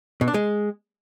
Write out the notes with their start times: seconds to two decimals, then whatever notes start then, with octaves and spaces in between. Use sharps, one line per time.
0.21 B2
0.28 D4
0.34 G#3